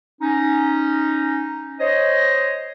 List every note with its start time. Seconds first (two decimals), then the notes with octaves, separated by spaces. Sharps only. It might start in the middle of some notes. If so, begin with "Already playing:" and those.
0.22 C#4 D#4
1.80 C5 C#5 D#5